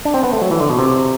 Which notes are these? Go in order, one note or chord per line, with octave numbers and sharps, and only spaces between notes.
D4
C4
B3
A3
F#3
E3
D3
B2
C3